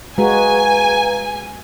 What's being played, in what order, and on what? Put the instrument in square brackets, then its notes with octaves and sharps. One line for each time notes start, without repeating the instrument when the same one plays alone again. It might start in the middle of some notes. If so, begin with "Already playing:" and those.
[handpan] G#3 F#4 [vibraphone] B4 F5 A#5 [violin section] G#5